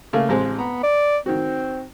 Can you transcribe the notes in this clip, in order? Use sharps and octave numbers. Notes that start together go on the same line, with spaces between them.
C#3 A3 A#3
A1 G#3 C4
B3 A#5
D5
D#3 C4 F#4